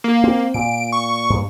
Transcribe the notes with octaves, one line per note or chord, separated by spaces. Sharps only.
A#3
C4
A#2 D7
C#6
G2 A#2